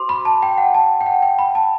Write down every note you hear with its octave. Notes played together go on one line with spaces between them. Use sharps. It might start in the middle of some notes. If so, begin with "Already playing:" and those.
Already playing: F#4 C5 C6 D6
B5
A5
G5
F#5
A5
G5
F#5
G5
B5
A5